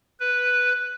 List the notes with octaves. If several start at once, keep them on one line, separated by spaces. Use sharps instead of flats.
B4